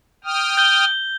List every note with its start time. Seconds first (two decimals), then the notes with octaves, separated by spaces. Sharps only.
0.24 G5 D#6 F6
0.57 G6 G7